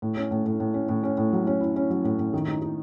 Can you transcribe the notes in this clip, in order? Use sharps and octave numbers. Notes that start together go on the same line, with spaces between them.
A2
C#4
A2
A2
A2
C#4
A2
C#4
A2
F#3
C#4
E4
C#4
F#3
A2
A2
D#3
D#4
D#4